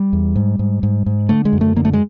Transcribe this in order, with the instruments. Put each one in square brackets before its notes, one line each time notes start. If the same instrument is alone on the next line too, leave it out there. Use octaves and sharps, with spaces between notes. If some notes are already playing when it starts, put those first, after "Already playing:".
Already playing: [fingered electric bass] G3
E2
G#2
G#2
G#2
G#2
D3 A3
G#3
F#2
A3
D3 A#3
A3
G#3